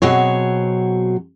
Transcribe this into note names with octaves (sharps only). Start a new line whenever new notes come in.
B2 F#3 C4 G#4 C#5